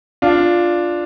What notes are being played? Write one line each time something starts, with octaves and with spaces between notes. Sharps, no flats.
D4 F4